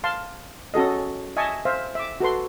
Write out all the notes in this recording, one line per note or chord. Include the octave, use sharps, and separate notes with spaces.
F5 A5 C6
C#4 F#4 A4 D#5
D#5 E5 G#5 A5 C#6
C5 E5 F5
E5 D6
F#4 A4 B4 C6